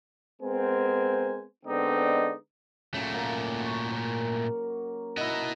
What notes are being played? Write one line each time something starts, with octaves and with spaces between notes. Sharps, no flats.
G#3 B3 C4 A#4 C5 G#5
D3 G#3 B3 C4 D#4 D5
A#2 C#3 F#3 A3
A#3
F#4
A#4 C#5
D#4 E4 F#4 D#5